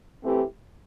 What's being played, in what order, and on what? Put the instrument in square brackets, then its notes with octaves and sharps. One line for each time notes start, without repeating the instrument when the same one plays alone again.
[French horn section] E3 A3 C4 E4 G4